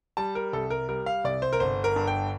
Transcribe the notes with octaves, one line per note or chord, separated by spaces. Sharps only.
G3 A5
A#4
C2 A4
A#4
G3 A#4
F5
C2 D5
C5
A#4
G1 C5
A#4
G2
G5